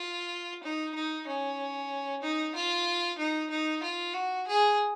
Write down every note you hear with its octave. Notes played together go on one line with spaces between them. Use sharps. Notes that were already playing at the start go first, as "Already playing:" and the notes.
Already playing: F4
D#4
D#4
C#4
D#4
F4
D#4
D#4
F4
F#4
G#4